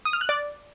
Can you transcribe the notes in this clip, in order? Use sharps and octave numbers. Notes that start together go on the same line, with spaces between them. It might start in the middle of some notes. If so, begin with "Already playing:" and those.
D#6
F6
F#6
D5